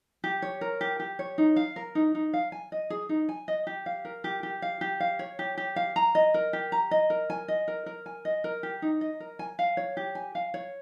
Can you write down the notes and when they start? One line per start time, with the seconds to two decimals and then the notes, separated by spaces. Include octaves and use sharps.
0.24 G4
0.42 C#5
0.61 A#4
0.81 G4
1.00 G4
1.19 C#5
1.38 D#4
1.56 F5
1.76 A#4
1.95 D#4
2.15 D#4
2.34 F5
2.52 G#5
2.72 D#5
2.90 G#4
3.09 D#4
3.29 G#5
3.48 D#5
3.67 G4
3.86 F5
4.05 A#4
4.24 G4
4.43 G4
4.62 F5
4.81 G4
5.00 F5
5.19 C#5
5.39 G4
5.57 G4
5.76 F5
5.96 A#5
6.15 D#5
6.34 A#4
6.53 G4
6.72 A#5
6.91 D#5
7.10 A#4
7.30 G#5
7.48 D#5
7.68 A#4
7.86 A#4
8.06 G#5
8.25 D#5
8.44 A#4
8.63 G4
8.82 D#4
9.01 D#5
9.20 A#4
9.39 G#5
9.59 F5
9.77 C#5
9.97 G4
10.15 G#5
10.35 F5
10.54 C#5